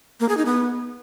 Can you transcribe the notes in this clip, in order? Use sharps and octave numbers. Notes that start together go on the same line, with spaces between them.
A#3
G#4
D#4
B3